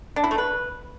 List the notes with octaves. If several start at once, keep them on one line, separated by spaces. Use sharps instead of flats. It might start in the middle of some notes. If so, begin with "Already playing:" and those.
D4
E4
A3
B4